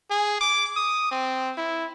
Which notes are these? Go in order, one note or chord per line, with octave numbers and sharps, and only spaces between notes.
G#4
D6
D#6
C4
E4